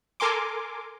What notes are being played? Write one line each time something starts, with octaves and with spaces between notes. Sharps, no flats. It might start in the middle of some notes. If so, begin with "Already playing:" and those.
A4 A#4 G#5 C6 D6